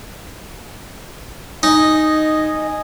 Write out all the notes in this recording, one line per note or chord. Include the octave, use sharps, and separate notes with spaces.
D#4 D#5 G#5